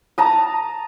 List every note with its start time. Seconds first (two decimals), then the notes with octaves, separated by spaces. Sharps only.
0.18 A5 A#5 D#6